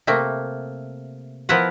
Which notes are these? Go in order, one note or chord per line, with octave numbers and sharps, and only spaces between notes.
C3 A3 A#3
F3 B3 E4 A#4 B4 F#5